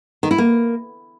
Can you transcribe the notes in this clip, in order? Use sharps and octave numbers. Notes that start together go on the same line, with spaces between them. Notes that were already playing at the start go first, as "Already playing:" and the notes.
D#3
E4
A#3